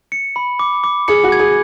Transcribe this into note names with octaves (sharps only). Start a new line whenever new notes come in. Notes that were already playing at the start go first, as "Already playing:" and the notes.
C#7
B5
D6
D6
G#4 C#7
F#4
G#6
G#4